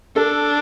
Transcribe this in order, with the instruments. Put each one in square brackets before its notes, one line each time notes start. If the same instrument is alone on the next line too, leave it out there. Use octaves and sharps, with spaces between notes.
[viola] D4 [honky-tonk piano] A4